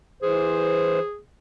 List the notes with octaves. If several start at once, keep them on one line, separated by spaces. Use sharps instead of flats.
E3 G#4 C5